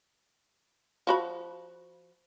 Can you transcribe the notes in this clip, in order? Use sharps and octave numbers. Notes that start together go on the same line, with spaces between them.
F3 F#4 B5